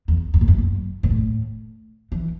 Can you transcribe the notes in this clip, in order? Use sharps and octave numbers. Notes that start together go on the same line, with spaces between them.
E2
F#2
G#2
F#2
F#2
G#2
A2
E3